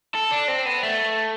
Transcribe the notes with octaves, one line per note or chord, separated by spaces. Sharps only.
A4
D4
C4
B3
A3